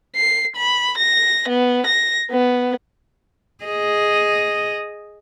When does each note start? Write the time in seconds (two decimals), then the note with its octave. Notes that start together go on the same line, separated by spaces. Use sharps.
0.15 C7
0.56 B5
0.97 A#6
1.48 B3
1.86 A#6
2.30 B3
3.64 G#4 D#5